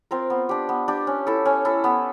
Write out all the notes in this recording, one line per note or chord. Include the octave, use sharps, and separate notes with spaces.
C4 F4 A#4
B3
D4 G4
B3
D4 G4
C#4
E4 A4
C#4
E4 A4
B3